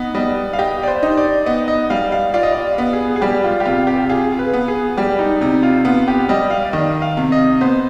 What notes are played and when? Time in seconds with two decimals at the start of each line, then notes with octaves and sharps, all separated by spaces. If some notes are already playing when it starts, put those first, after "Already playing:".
Already playing: B3 D#4
0.15 G3 D#5
0.53 F5
0.59 G4 D#5
0.83 D5
0.88 C5
1.03 D#4
1.18 D5
1.46 B3 D#5
1.68 D#5
1.90 G3 F5
2.12 F5
2.34 F4 D5
2.43 D#5
2.52 D5
2.78 B3
2.93 G#4
3.16 G#4
3.21 G3 G4
3.44 F4
3.60 G4
3.65 C3 F4
3.87 G4
4.09 F4 G#4
4.32 G#4
4.39 B4
4.53 B3
4.68 G#4
4.97 G3 G4
5.19 D#4
5.41 C3 D#4
5.63 F4
5.85 B3 F4
6.08 G4
6.29 G3 D#5
6.50 F5
6.63 D5
6.73 D#3 D#5
7.02 F5
7.17 C3
7.32 D#5
7.61 B3 C5